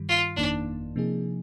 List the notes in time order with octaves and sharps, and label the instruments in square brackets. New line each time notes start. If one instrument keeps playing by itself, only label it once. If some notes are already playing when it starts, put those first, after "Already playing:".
Already playing: [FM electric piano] G2 D#3 G3
[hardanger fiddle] F4
[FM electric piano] G1 F2 D#3 A#3 D#4 [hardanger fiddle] D4
[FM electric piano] C3 F3 A#3 D#4 G#4